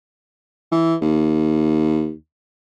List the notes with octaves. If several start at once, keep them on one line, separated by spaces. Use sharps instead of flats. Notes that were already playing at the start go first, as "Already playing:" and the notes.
E3
D#2